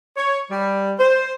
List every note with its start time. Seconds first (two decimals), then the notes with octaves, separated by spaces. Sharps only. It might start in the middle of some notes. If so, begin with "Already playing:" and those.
0.17 C#5
0.51 G3
0.99 C5